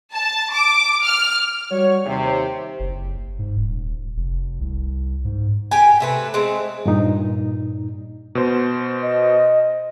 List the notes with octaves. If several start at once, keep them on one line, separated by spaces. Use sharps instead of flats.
A5
D6
F6
G3 F#4 C#5
D#2 C3
F#1
G#2
D#1
F1
C2
G#2
G4 G5 G#5
C3 A3 B4
G#3 A3 C4
G2 A#2 D#4
B2 C5
D#5